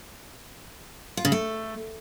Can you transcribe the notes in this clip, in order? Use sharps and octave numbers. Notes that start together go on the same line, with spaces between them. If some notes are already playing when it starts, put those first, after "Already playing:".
F4
C#3
A3